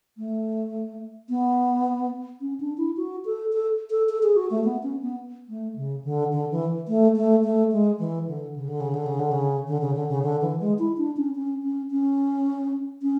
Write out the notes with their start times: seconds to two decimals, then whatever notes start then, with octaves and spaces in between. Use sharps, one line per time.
0.18 A3
1.29 B3
2.41 C#4
2.60 D4
2.78 E4
2.97 F#4
3.25 A4
3.53 A4
3.90 A4
4.09 A4
4.23 G#4
4.36 F#4
4.51 A3
4.64 B3
4.83 C#4
5.02 B3
5.49 A3
5.76 C#3
6.04 D3
6.32 D3
6.51 E3
6.88 A3
7.16 A3
7.44 A3
7.72 G#3
7.99 E3
8.28 D3
8.56 C#3
8.68 D3
8.81 C#3
8.94 D3
9.06 C#3
9.20 D3
9.32 C#3
9.67 D3
9.81 C#3
9.95 D3
10.09 C#3
10.23 D3
10.41 E3
10.60 G#3
10.79 E4
10.97 D4
11.17 C#4
11.35 C#4
11.63 C#4
11.91 C#4
13.02 C#4